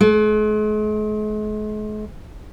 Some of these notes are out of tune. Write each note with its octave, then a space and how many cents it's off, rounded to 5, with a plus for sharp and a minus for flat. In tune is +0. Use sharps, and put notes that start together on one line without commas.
G#3 +45